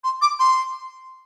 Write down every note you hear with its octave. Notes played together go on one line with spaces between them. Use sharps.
C6
D6
C6